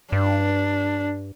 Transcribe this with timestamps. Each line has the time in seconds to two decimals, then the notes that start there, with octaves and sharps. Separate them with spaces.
0.12 G2 D4